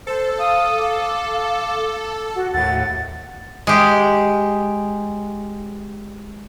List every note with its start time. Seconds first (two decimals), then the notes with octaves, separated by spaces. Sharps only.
0.07 A4 C5
0.39 F5 D#6
0.78 F5 D6
2.36 F#4 F#5
2.54 D#2 A2 F#5 A6
3.67 G#3 G4